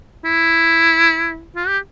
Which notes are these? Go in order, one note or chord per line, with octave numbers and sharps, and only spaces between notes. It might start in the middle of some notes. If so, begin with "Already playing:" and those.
E4
F4
G4